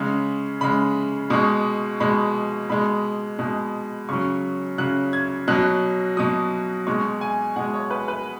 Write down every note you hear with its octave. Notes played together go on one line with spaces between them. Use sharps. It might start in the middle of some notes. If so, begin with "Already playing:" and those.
Already playing: C#3 G#3
C#3 G#3 B5
B2 G#3 C#6
B2 G#3 B5
B2 G#3 B5
B2 G#3
C#3 F#3 C#6
C#3 F#3 F#6
G#6
B2 F#3 F#6
B2 F#3 D#6
B2 G#3 C#6
G#5
B2 G#3 F#5
C#5
B4
B4